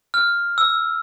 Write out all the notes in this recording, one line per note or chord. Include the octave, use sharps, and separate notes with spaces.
F6
E6